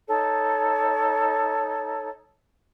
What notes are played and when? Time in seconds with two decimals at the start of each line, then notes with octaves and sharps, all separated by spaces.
0.08 D#4 A4 C#5